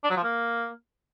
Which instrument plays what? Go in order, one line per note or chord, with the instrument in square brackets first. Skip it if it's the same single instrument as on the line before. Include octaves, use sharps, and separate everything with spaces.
[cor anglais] D4
F#3
F3
A#3